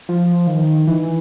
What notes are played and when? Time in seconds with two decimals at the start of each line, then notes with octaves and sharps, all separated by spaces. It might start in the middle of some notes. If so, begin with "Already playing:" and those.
0.09 F3
0.47 D#3
0.87 E3